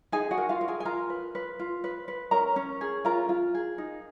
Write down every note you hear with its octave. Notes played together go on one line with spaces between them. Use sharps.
D#4 G#4 G#5
F#4 F#5
A#4
F4 F5
A#4
G#4 G#5
G#5
F4 A#4 A#5
B4
B4
F4
B4
B4
C#4 A#4 A#5
C#4
G#4
F4 A#4 A#5
F4
G#4
D#4